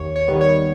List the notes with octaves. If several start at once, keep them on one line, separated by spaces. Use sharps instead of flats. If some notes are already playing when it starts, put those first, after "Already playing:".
Already playing: D#2 C#5
C#5
D#3 G3 B3
C#5